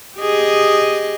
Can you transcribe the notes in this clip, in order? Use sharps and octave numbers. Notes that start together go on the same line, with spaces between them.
G4 G#4 D#5